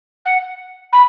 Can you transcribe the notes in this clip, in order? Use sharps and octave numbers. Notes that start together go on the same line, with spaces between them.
F#5
B5